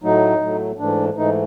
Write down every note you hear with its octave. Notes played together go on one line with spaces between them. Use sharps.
A2 F#3 A3 D#4
A2 F#3 A3
G#2 E3 A3 D4
G#2 E3 A3 D#4